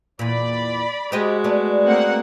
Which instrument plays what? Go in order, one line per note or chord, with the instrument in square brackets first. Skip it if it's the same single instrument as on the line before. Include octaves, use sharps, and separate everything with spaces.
[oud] E2 A#2 [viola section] D5 B5
[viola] G#3 F#4 [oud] G4 C5 D#5
[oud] A3 B3 D5
[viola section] A#3 C4 F#5